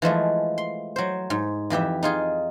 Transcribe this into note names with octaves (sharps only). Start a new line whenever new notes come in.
E3 F3 G#3 A3
C6
F#3 C5
G#2
F2 E3 G4 E5
D#4 F4 G#4